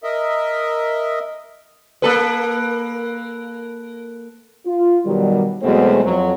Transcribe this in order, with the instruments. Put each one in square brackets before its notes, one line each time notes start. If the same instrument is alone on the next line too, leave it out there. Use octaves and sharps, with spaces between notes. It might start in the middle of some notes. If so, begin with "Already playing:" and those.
[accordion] A#4 D#5 E5
[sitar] A#3 A4 B4
[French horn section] F4
B2 D#3 F#3 G3
E2 B2 F#3 G#3 A3 C4
F2 F#3